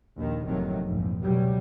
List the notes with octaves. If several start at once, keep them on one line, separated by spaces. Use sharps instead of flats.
A#1 D#2 D#3
F#1 F2 A2 C3 D#3 F#3
F1 A#1 F2 G#2
C#2 B2 F#3 G3